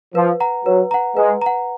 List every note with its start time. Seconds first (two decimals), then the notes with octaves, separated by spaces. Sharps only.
0.15 F3 B4
0.40 F#5 A#5
0.65 F#3 B4
0.91 F#5 A#5
1.16 G#3 B4
1.42 F#5 A#5